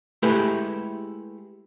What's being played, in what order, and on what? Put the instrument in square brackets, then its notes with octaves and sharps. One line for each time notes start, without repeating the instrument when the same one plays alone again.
[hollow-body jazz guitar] G#3 A3 E4 G4 B4